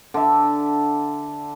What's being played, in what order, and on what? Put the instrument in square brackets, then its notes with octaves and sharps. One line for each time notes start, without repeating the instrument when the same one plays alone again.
[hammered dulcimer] D3 E5